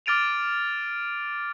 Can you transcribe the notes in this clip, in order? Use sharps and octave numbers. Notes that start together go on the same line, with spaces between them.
D6 F6 A6 D7 D#7 F7